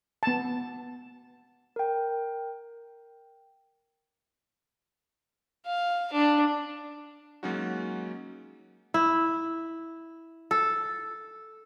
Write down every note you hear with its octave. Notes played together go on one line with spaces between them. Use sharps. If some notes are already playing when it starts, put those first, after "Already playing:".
B3 A5
A#4 G5
F5
D4
F#3 G#3 A#3 C#4 D#4 F#4
E4
A4